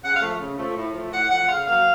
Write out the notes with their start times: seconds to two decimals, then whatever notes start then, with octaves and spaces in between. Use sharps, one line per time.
0.03 C#3 F#5
0.15 F5
0.22 F3 A3
0.40 C#3
0.58 F3 A3
0.76 A2
0.94 F3 A3
1.12 A2 F#5
1.30 F3 A3 F#5
1.48 C#3 F5
1.67 F#3 A#3 F5